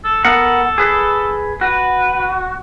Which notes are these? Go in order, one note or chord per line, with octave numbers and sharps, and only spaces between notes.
A4
B3 A4 A#4 F#5
G#4 B4
F#4 B4